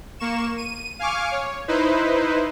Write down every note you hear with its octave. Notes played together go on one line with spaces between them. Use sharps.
A#3 C#6 E7
D#7
F5 G#5 C#6 D6 F6
C#5
D#4 E4 B4 C5